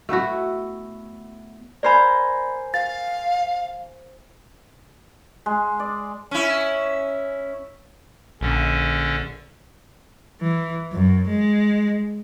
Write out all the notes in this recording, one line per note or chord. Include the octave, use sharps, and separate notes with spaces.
A3 B3 E4 F#4
A#4 C5 D5 G#5 B5
F5 A6
G#3
D5
C#4 E4
A#1 D3 C#4
E3
F#2
G#3